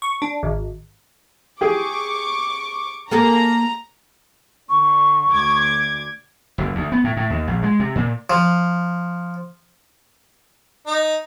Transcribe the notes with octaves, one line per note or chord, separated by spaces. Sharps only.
C#6
D4
G#1
G4 G#4 C#6 D6
A#3 G#4 A4 A#5
D3 C#6
D2 D6 G#6
F#1
D2
B3
A2
A2
D#2
A#1
G#3
C3
A#2
F3
D#4